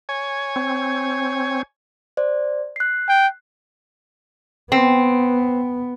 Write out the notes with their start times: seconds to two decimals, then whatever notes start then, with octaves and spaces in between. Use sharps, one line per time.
0.09 C#5 G#5
0.56 C4
2.17 C5 D5
2.76 F#6 C7
3.09 G5
4.72 B3 C4